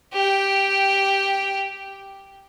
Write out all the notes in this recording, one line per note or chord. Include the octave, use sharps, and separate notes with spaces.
G4 G5